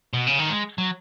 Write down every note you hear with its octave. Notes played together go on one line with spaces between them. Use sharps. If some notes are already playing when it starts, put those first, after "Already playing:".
B2
C#3
D#3
G#3
F#3